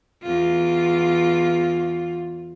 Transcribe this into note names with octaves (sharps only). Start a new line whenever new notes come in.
E2 F4